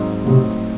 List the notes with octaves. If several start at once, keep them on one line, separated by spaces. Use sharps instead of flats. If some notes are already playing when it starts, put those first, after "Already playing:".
Already playing: G#2 F#3 C4 D#4
A2 C3 F#3 C4 D#4